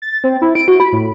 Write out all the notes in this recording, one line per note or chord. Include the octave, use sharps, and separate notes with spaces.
A6
C4
E4
D7
F#4
B5
A2